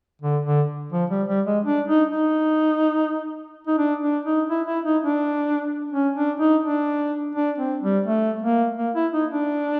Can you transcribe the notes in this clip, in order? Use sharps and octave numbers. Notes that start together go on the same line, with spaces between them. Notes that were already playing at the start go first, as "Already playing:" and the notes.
D3
D3
F3
G3
G3
G#3
D4
D#4
D#4
D#4
D4
D4
D#4
E4
E4
D#4
D4
C#4
D4
D#4
D4
D4
C4
G3
A3
A#3
A#3
E4
D#4
D4